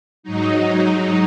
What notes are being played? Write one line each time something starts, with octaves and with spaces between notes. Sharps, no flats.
G#2 F#3 D#4